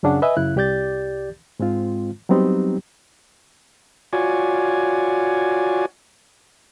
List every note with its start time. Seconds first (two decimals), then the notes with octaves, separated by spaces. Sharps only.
0.03 F#2 C#3 C#4 D4 G#4 F#5
0.22 B4 D#5 E5 G#5 E6
0.37 F#2 C#3 E4 F#6
0.56 C2 G4 D5 G6 A6
1.59 G#2 G#3 C4 F4
2.29 F#3 G3 B3 C4 D#4 G4
4.13 F4 F#4 C#5 D5 G#5